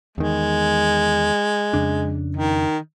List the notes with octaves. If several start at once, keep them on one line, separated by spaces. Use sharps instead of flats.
E2 D#3 G#3
F2 C#3 D4
D#3